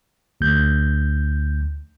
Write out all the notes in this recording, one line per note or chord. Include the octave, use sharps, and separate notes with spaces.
D2 G6